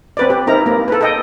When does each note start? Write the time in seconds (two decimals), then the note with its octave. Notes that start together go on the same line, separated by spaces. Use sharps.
0.17 C4 B4 D5
0.30 G4
0.47 C4 D#4 E4 A#4 A#5
0.66 A#3
0.88 A4 B4
1.01 A4 D#5 G5